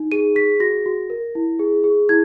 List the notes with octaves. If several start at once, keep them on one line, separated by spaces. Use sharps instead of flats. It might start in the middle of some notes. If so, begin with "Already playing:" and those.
Already playing: D#4
G#4 D#7
G#4 B6
F#4 A#6
F#4
A#4
E4
G#4
G#4
E4 G#6